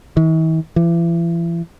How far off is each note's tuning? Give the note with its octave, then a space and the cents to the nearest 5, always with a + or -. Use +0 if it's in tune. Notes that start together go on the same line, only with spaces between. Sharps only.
E3 -45
E3 +40